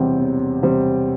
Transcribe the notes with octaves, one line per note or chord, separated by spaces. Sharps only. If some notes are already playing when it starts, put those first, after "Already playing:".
Already playing: E1 E2 C3 G3 C4
E1
C3 G3 C4